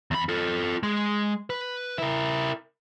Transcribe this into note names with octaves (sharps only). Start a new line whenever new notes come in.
E2 B5
F4 A4
G#3
B4
E4 A#4